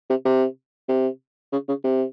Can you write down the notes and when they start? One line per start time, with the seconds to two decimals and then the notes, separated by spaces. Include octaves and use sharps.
0.10 C3
0.25 C3
0.89 C3
1.53 C#3
1.68 C#3
1.84 C3